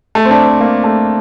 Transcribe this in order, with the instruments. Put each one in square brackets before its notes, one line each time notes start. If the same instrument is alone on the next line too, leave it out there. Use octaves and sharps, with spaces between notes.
[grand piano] A3
C4
D4
C4
A#3
A3